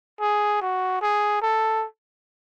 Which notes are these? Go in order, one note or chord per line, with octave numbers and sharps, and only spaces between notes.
G#4
F#4
G#4
A4